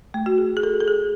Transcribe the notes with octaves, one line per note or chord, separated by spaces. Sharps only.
A3
F#4
G#4
G#4
A4
A4
G#4